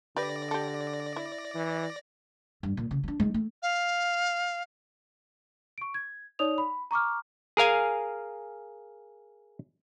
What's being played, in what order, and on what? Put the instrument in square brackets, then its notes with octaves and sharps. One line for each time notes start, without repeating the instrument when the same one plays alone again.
[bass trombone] D3 [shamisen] G4 B4 [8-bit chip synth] D5 A#6
[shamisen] G4 A4
E4
[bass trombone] E3
[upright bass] G2
A#2
C#3
F#3 D4
G#3 D#4
A3
[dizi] F5
[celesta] C#6 D7
G#6
D#4 C#5 D5 D#6 F7
B5
A#5 C#6 D6 F6
[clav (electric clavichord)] G#4 A#4 F5 G#5